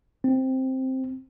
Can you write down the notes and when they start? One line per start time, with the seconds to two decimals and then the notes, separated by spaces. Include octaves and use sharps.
0.24 C4